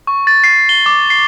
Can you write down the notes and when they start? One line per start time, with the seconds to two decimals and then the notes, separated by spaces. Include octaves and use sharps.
0.07 C#6
0.27 A6
0.44 C7
0.69 G7
0.86 D6
1.10 C7